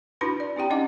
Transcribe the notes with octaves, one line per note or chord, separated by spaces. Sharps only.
D4 E4 F#4 B4 B5
D5
C4 E4 G4 G5 A#5
C#4 D#4 D#5 F#5 D6